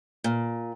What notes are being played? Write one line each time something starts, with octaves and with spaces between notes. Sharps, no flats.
A#2